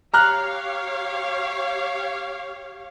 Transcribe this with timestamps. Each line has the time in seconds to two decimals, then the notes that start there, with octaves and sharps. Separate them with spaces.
0.14 G4 C#5 F5 A#5 F6 F#6